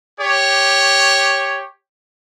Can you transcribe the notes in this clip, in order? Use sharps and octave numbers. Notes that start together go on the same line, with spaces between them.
G4 C#5